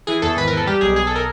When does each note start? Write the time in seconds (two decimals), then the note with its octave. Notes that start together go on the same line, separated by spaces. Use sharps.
0.07 E3 G#4
0.22 E2 A4
0.37 G#1 B4
0.48 A#4
0.53 E3 A4
0.66 G3 G4
0.81 B1 G#4
0.96 B1 G#4
1.07 A4
1.16 A#4